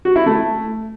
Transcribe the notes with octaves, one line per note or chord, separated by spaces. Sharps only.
F#4
E4
A3